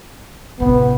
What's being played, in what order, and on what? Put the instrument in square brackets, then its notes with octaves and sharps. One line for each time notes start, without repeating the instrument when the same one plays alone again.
[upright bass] A1 C3 [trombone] B3